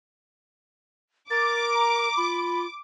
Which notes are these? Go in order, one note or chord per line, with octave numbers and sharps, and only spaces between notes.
A#4 D6 A6
A#5
F4 B5